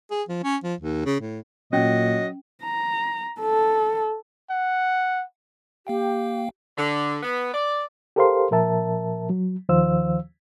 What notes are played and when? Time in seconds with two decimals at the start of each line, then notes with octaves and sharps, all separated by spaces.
0.11 G#4
0.29 F3
0.43 C#4
0.64 F3
0.80 D#2
1.05 C#3
1.21 A2
1.73 A#2 F#3 C#4 D#5
2.63 A#5
3.40 A4
4.51 F#5
5.87 A#3 G4 F5 G5
6.77 D3
7.23 B3
7.54 D5
8.16 G4 A4 A#4 C5 F5 C6
8.51 A#2 F3 A#4 E5 A5
9.30 F#3
9.69 D#2 D#3 F3 C5 F5 E6